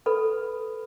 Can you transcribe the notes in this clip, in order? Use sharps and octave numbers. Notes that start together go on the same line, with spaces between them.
A4 B4 B5